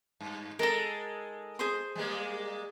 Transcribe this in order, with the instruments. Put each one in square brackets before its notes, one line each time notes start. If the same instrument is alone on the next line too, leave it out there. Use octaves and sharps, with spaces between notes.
[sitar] G2
[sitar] G#3 A4 [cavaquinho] A#4 A#5
[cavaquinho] G#4 C5 C6
[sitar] G3 G#3 A#3